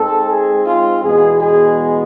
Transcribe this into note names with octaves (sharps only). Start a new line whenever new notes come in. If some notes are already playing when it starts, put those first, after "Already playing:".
Already playing: G#2 G#3 C4 A4
G#4
F4
E2 B2 G#3 B3 G#4
G#4